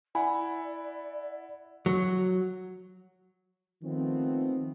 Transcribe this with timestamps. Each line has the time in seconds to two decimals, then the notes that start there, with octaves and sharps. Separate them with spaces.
0.15 E4 D5 F#5 G#5 B5
1.86 F#3
3.83 D#3 F3 A3 B3 C4